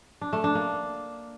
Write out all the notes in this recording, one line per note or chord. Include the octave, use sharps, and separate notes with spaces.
D4
A3
D4
A#3